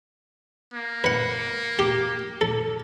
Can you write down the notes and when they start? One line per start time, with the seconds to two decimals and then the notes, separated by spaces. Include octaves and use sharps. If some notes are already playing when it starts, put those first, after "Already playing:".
0.74 A#3
1.04 B4 F#5
1.79 G4
2.41 A4